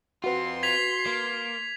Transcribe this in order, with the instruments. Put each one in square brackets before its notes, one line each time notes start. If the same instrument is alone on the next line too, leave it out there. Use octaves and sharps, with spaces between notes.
[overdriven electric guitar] C4 F4 [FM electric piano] F#4 B4 [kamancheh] C6
[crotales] G#6 B6 F7
[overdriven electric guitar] A#3